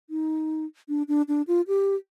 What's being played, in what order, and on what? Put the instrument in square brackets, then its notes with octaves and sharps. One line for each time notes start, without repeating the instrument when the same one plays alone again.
[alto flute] D#4
D4
D4
D4
F4
G4